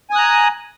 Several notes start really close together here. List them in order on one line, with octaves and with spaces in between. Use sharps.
G#5 D#6 F#6 A#5